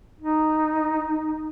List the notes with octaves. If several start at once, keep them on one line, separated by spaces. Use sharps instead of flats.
D#4